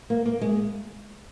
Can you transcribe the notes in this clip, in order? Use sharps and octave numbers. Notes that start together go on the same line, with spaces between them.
A#3
A#3
G#3